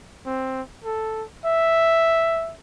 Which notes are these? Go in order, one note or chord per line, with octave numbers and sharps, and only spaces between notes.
C4
A4
E5